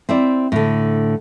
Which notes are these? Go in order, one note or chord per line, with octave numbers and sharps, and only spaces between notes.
C4 E4 D5
A2 D3